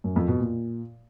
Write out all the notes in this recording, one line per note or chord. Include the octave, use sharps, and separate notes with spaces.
F#2
F2
B2
A#2